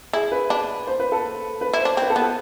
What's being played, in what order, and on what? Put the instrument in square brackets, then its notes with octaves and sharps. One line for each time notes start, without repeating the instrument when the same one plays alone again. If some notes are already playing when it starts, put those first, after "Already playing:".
[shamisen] E4 [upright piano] G#4
[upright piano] B4
[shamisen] D4
[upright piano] C5
B4
A4
B4
[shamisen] E4
[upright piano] C5
[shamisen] D4
[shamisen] C4 [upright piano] B4
[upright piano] A4
[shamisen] B3
[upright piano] A4